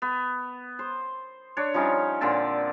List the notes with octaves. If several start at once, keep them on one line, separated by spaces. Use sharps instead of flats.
B3
C5
D4 C#5
F3 G3 C#4 D#4
A#2 D3 C4 A5